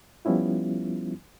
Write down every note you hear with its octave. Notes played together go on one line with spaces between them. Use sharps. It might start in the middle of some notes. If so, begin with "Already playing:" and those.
F3 G3 B3 C#4 E4 F4